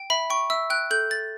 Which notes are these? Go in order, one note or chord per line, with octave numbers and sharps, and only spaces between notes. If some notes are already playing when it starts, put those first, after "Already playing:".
Already playing: G5
E5 B5
G5 C#6
E5 E6
G5 F#6
A4 G6
A4 A6